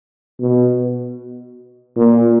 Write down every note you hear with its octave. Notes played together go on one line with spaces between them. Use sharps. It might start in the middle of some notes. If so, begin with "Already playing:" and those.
B2
A#2